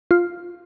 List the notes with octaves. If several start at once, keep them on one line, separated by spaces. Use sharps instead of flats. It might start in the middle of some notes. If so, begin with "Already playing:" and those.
F4